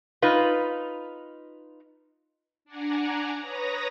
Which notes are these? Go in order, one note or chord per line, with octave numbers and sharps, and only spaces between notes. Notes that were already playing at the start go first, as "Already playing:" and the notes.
D#4 F4 B4
D4 D5 F#5 G#5 A#5
B4 C#5 A#5 D#6 A#6